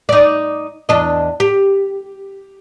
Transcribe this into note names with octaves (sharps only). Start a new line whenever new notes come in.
D#4 D5
E2 D4 D#5
G4